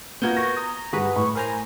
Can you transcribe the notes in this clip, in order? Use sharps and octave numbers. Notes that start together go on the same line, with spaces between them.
A#3 B3 F4 F#4 A#4 G6 G#6
C#6 A#6
A#5 D#6
G2 F#4 G#4 B4
A2 B5 C#6
A#4 C5 G#5 A#5